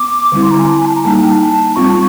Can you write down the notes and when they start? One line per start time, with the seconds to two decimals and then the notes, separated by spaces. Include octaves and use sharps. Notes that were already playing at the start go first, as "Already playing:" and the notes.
Already playing: B3 D6
0.32 D3 G3 C4 E4
0.42 C6
0.51 A#5
0.59 G#5
0.68 A5
0.78 G#5
0.86 A5
0.95 A#5
1.05 G3 A#3 D#4 A5
1.14 G#5
1.22 G5
1.31 A5
1.76 G3 C4 F4 C#6